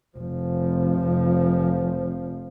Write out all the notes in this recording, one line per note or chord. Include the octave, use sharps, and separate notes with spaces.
F1 F3